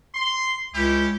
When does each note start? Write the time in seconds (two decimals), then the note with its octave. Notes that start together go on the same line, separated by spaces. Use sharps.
0.14 C6
0.74 C#2 C#4 E4 G4